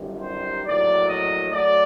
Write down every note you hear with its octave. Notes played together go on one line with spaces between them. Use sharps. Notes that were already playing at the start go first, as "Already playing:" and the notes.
Already playing: G1 F#2 D#3 G3
C5
A#1 A2 F#3 D5
D#5
F#3 A3 D5